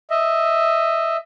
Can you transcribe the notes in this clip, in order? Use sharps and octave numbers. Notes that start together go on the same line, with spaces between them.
D#5 E5